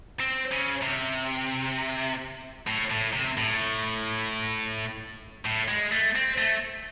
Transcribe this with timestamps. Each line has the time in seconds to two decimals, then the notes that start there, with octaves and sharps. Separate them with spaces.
0.20 C4
0.51 C#3
0.82 C3
2.67 A2
2.91 A2
3.13 C3
3.37 A2
5.46 A2
5.69 G#3
5.92 A3
6.16 C4
6.38 A3